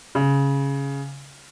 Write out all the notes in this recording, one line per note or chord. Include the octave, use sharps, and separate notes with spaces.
C#3